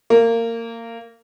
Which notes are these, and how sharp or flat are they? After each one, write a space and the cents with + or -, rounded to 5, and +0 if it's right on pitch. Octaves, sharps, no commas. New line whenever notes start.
A#3 -20